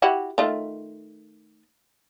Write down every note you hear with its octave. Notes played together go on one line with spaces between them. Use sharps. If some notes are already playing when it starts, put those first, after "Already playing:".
E4 F#4 G4
D#3 A3 F4